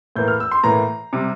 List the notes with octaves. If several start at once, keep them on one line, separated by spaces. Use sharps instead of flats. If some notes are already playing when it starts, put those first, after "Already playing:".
A2 E3 A#3 G6
F6
E6
C6
A2 E3 A#3 A#5
C3 G3